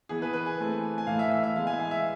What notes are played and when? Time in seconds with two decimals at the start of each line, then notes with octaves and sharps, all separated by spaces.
0.09 E3 B3 G#4
0.22 B4
0.34 B4
0.46 G#5
0.58 E3 A3 C4
0.98 G#5
1.07 A2 E3 A3 F5
1.19 E5
1.32 E5
1.44 E5
1.55 E3 G#3 B3 F5
1.67 G#5
1.80 F5
1.91 E5